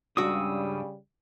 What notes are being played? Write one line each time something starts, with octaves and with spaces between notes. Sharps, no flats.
C#2 G2 C#3 G3 D4 F#4 D#6 E6